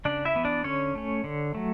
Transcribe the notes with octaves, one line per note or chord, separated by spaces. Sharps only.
C#3 D4 D5
E4 E5
E3 B3
D4 D5
D3 C#4 C#5
A3 C#4
D3
F#3 A3